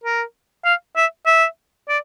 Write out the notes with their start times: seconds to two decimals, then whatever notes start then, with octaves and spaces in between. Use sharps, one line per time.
0.04 A#4
0.65 F5
0.96 E5
1.26 E5
1.89 D5